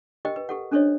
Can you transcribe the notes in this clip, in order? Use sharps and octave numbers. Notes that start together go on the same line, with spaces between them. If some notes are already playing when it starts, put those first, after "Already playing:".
G4 A#4 D#5 G5
B4
G4 A4 F#5
C#4 D4 A4 C5 C#5 D#5